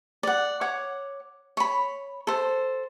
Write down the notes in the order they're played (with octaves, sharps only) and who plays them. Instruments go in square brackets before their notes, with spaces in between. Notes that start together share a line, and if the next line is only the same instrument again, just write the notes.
[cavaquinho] D5 F#5
C#5 F#5 D6
C#5 B5
A4 C5